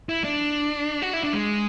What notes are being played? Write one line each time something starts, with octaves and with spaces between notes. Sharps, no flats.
E4
D4
F#4
E4
D4
G#3